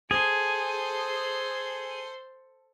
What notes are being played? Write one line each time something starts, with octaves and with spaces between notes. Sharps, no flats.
G#4 A4 C5